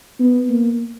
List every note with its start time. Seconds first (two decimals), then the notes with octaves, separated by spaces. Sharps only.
0.19 B3
0.49 A#3